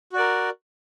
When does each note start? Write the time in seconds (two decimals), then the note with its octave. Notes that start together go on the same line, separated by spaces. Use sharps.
0.13 F#4
0.16 D5
0.19 A#4